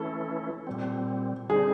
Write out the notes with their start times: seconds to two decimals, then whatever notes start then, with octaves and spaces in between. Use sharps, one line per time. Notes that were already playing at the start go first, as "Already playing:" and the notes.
Already playing: E3 A3 C#4 E4 A4
0.67 A#2 G3 C4
1.49 D3 G3 C4 D#4 G#4